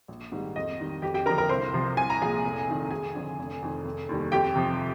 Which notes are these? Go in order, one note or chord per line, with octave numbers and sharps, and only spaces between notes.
A#1
G#2 D#3 G3
F2 D#5
D#3 G3
F2 G4 G5
G4 G5
D3 F3 A#4 A#5
A#4 A#5
C2 C5 C6
C3 F3
C2 G#5
A#5
A#2 F3 G#4 G#5
F1
F2 D#3
F1 G#4 G#5
F2 D3 F3
F1
F2 D#3
F1
D#2 D#3 G3
F2 G4 G5
C3 F3